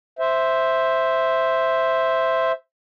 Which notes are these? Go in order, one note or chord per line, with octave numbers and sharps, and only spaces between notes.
C5 E5